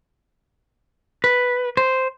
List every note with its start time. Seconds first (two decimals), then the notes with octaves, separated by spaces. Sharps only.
1.24 B4
1.77 C5